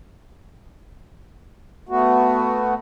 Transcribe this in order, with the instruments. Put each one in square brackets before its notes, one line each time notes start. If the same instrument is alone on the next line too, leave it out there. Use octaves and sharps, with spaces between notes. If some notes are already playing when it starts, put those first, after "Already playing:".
[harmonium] A3 B3 F#4